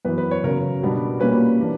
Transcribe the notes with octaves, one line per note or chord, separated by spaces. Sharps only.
F#2 E3 B3 B4
B4
C#5
C#3 F#3 C#4 A#4
B2 G3 B3 D4
A#2 G3 A#3 C#4 B4
E3 A#3 D4